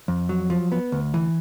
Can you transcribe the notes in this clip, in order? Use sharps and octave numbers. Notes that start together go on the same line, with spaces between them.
F2
F#3
F3
B3
D2
E3